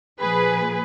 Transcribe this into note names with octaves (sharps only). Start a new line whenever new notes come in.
A#2 F3 G#4 B4